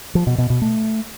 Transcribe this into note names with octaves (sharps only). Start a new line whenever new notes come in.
F3
B2
B2
B2
A3